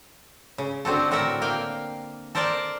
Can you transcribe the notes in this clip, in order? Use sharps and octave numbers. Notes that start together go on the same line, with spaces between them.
C#3
D3 C4 F#4 A4
A2 F#4 A4 A#4 E5
A#3 F5 G5
A4 A#4 C5 D5 A5 A#5